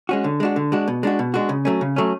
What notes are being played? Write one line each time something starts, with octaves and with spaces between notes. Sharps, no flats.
G#3 C#4 F#4
D3
G#3 D4 F#4
D3
G#3 D4 F#4
B2
G#3 D4 F#4
B2
G#3 D4 F#4
C#3
F#3 A3 C#4
C#3
F#3 A3 C#4